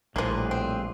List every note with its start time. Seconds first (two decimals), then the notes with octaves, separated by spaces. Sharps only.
0.16 A#1 A2 F3 G3 A#3 G#4 B4
0.51 C4